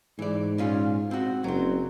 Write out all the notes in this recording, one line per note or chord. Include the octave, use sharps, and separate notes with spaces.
G#2 E3 D5
A#2 C#4 F4
C4 F#4
F#1 F#3 C4